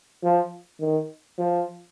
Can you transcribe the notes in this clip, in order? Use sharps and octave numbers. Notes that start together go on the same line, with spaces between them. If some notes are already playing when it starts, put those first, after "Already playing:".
F3
D#3
F3